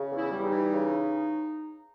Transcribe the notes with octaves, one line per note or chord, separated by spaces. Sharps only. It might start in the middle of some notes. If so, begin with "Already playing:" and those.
Already playing: C#3
E2
E4
G3
D#4
E3
C#3